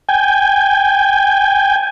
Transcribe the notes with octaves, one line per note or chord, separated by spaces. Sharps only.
G5 G#5